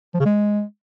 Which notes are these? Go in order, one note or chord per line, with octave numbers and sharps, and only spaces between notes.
F3
C#3
G#3